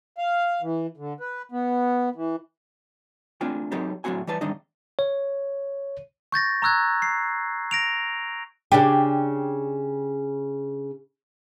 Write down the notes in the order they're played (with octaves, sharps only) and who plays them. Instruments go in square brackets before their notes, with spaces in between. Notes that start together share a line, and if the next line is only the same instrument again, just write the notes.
[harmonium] F5
E3
D3
B4
B3
E3
[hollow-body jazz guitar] A3 C4 D4 F4 G5 G#5
F#3 C4 D#4 G4 A4
A2 F#3 A3 C4 F#4 G#5
E3 G3 B4 A5
G#2 D#3 G3 D4 D#4 D#5
[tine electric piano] C#5
[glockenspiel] C#6 G6 A6 A#6
A#5 C#6 E6 F#6 G#6
C7
A#6 D7 F7
[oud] C#3 D4 G4